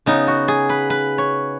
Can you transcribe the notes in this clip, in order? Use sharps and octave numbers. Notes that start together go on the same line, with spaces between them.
C#3 B3 D#4
F#4
G#4
B4
B4
C#5